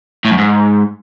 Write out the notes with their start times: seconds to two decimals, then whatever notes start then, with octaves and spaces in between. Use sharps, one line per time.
0.25 A2
0.31 F#2
0.38 G#2